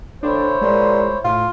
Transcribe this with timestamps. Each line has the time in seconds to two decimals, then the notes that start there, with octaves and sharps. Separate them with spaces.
0.23 D2 D4 E4 C5 C#5
0.61 A#2 G#3
1.25 A2 F4